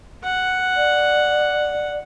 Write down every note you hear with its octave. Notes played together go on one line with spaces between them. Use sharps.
F#5
D5